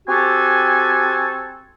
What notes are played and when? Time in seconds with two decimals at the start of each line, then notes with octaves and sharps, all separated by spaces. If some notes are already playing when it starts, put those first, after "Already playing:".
0.07 C4 F#4 G4 A4 G#5